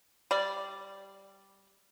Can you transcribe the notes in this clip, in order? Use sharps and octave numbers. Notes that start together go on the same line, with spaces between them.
G3 D5